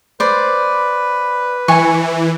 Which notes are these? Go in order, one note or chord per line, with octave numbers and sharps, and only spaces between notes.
B4 C5 D5
E3 G#5 C#6